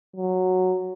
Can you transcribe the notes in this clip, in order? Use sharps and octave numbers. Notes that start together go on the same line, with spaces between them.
F#3